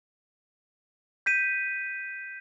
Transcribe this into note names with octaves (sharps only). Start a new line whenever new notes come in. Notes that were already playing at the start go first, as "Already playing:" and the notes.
G6 B6 D#7